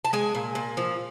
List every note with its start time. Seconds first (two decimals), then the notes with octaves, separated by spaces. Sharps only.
0.05 A5
0.13 G#3 G#5
0.35 A#2
0.55 A#2
0.77 F3